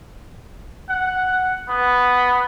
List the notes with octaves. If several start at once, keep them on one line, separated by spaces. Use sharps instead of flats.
F#5
B3